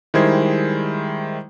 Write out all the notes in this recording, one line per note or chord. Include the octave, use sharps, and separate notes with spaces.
D#3 G3 G#3 E4 C5 G#6